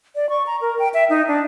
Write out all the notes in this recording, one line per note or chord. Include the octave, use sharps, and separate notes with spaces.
D5
C#6
A#5
A#4
G5
E5
D#4
D4